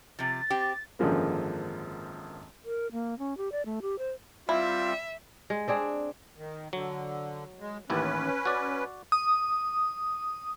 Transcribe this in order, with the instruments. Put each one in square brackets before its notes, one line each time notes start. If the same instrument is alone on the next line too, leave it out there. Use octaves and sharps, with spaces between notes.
[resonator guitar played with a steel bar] C3 F3 [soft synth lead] A6
[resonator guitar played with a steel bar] C4 G4
[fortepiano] G#1 F#2 D3 F3 G#3 A#3
[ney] A#4
A#3
C#4
G4
D5
A3
G4
C5
[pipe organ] G3 C4 [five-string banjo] E4 [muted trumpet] F4 [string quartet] E5
[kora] G#3
C4 D4 G#4
[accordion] D#3
[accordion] D3 [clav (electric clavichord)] F#3
[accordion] G#3
[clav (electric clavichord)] A1 D#2 E4 [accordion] C#4 B4
[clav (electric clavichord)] F#4 D5
[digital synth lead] D#6